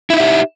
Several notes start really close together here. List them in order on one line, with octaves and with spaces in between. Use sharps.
E4 D#4 E5 G4